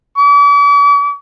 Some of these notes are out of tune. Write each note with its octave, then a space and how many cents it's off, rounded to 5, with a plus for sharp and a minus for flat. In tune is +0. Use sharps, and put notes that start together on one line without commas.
D6 -45